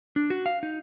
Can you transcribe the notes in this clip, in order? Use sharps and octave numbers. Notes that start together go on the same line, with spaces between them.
D4
F#4
F5
D#4